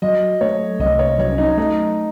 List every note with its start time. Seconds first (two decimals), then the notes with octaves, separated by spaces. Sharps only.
0.02 F#3 D#5
0.41 A3 C#5
0.80 C2 D#5
0.99 C#5
1.18 F#3 C#5
1.32 C#4
1.38 D#4
1.58 A3 D#4